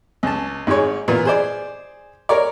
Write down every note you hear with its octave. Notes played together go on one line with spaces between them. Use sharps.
C#2 A5
G#1 G#2 G#3 G#4 C#5
A#2 E3 B3
G#4 C5 D5
A#4 C#5 D5